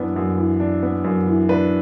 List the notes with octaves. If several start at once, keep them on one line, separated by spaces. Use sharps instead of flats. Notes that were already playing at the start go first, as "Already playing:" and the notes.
Already playing: F#2 E3 B3 D4
F#2
E3
D4
B3
F#2
E3
D4 B4